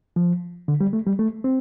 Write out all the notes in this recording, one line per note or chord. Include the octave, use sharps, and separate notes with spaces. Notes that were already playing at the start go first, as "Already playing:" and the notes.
F3
D3
G3
A3
G3
A3
C4